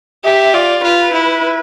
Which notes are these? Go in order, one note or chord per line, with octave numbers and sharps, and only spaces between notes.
G4 E5
F4 D5
F4 B4
E4